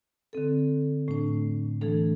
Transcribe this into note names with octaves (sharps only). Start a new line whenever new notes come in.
D3 C4 A4
A2 A3 D4
E3 A3 D4 A4